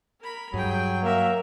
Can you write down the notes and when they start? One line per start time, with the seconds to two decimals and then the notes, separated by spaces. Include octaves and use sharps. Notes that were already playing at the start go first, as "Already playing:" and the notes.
0.21 A#4 B5
0.54 G2 F#3 G#4 G5
1.03 A#3 A#4 E5